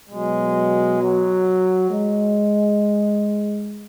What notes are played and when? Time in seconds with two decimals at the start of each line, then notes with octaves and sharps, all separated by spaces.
0.10 B2 F#3 G#3
1.01 F#3
1.90 G#3